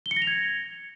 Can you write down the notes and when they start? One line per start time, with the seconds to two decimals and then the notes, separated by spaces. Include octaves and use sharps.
0.06 G7
0.11 C#7
0.16 A#6
0.22 F7
0.27 G#6